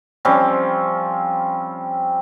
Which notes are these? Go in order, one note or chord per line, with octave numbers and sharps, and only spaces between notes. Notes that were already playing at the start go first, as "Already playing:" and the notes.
F3 G3 C4 C#4